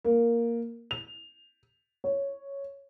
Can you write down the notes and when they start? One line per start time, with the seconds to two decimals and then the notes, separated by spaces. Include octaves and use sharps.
0.05 A#3
0.91 F7
2.04 C#5